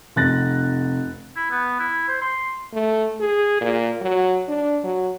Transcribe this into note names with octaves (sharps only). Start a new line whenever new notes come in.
F1 F#6 A6 A#6
E4
B3
E4
C5
C6
A3
G#4
A#2
F#3
D4
F#3